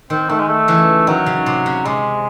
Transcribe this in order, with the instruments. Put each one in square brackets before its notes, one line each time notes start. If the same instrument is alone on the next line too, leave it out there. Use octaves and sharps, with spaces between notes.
[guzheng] D#3 [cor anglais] C4
[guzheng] D#3 [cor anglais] A3
[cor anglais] G#3
A3
[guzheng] C#3 E3
[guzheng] D#3 [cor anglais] F#3
[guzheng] C#3
C3
C#3
[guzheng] C3 [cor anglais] G#3